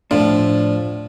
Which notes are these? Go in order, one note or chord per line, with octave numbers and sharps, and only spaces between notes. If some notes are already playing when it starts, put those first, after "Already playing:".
A2 F3 D4